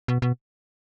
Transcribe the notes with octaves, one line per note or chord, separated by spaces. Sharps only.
B2
B2